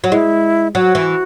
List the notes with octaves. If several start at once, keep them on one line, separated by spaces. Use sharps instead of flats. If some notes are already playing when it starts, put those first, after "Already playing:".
F#3
G#3 E4
F#3 F#4
E3